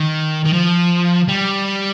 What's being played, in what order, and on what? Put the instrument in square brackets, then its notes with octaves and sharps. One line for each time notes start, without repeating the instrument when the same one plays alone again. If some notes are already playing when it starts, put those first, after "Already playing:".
Already playing: [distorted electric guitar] D#3
D#3
F3
G3